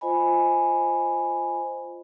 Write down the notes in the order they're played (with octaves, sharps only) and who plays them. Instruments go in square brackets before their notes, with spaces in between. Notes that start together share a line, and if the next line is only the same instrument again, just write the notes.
[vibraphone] F4 C5 D#5 G#5 B5